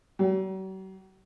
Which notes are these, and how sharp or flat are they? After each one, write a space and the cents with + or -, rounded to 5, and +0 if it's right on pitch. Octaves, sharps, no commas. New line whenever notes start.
F#3 +45